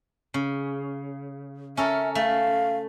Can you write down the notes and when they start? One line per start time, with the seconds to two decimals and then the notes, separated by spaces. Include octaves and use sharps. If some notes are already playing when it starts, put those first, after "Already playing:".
0.34 C#3
1.77 C#4 A4 A#4 E5
2.15 A3 F5